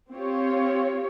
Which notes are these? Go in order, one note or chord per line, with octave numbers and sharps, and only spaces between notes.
C4 F4 G4 C#5